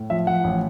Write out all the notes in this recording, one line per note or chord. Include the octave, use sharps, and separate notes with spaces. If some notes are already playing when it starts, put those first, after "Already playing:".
Already playing: A2
F3 E5
F3 F#5
A1